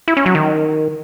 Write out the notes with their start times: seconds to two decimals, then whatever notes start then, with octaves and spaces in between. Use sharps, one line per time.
0.08 E4
0.17 C#4
0.26 F#3
0.35 D#3